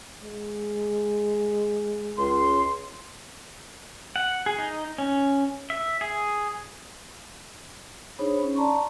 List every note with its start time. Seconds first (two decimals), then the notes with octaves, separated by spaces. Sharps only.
0.23 G#3
2.18 C#2 C6
4.16 F#5
4.46 G#4
4.58 D#4
4.98 C#4
5.70 E5
6.01 G#4
8.19 D4 D#4 G#4 C5 C#5 B5
8.42 C#4
8.56 D5 A5 A#5 C6 C#6